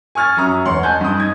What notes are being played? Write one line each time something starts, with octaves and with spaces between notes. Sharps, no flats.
G#5 C#6 F6 G#6 A6
F#2 F#3 A#5 D#6
E1 C#5 F#5 C6
D#5 G#5 A5 F#6 G6
G2 D#6
D#4 D#6 G#6